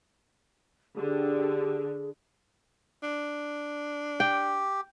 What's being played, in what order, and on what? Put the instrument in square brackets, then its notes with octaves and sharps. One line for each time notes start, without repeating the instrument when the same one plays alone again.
[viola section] D3 [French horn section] G4 [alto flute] G#4
[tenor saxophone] D4
[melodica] G4 [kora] G5